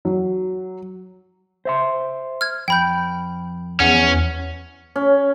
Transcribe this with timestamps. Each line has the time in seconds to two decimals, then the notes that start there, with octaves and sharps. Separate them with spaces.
0.05 F#3
1.65 C5 E5 C6
2.41 F6 G#6
2.68 F2 G5 B5 G6
3.80 E2 C#4 F#5
4.96 C#4